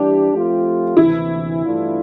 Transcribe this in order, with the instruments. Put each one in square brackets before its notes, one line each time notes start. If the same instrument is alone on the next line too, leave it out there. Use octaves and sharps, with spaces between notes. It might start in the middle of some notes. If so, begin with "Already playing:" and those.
Already playing: [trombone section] E3 G3 D4 [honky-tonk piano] G4
[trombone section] F3 A3 C4 F4
[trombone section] D2 C3 E3 [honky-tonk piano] E4
[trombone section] G2 E3 A3 D4 F4